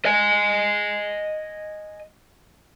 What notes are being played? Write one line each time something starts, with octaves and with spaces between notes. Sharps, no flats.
D#5 G#5